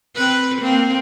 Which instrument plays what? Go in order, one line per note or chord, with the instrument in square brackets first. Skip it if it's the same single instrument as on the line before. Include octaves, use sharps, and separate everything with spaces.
[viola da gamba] C4 B4
A#3 C4